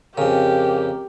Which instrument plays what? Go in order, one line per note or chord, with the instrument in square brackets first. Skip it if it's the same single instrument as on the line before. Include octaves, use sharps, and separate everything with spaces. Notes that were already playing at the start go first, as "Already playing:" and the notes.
[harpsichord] F2 C#3 [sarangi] G4 [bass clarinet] A#4